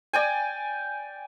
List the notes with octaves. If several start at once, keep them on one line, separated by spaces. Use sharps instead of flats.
D5 G5 G#5